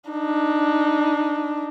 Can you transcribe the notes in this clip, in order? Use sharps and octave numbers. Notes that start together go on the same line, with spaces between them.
D4 D#4